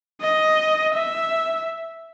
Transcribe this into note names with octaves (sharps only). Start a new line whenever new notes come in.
D#5
E5